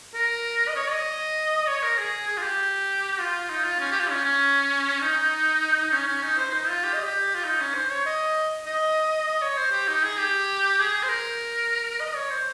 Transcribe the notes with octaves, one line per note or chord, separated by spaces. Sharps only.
A#4
D#5
C#5
D#5
C#5
A#4
G#4
G#4
F4
G4
F4
D#4
F4
C#4
G4
F4
C#4
C#4
D#4
C#4
C#4
D#4
C5
D#4
F4
G4
D#5
G4
F4
D#4
C#4
C5
C#5
D#5
D#5
D#5
C#5
C5
G4
D#4
G#4
G4
G#4
C5
A#4
D#5
C#5
C5